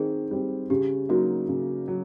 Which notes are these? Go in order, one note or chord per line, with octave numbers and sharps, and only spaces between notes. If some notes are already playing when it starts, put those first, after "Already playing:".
Already playing: D#3 C4 G#4
G3 C4
C#3 G4
F#3 A#3 D#4 F#4
C#3
F#3